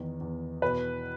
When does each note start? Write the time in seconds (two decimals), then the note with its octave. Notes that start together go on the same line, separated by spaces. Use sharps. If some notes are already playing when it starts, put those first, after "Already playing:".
Already playing: E2 D#3
0.20 E2
0.62 B2 B4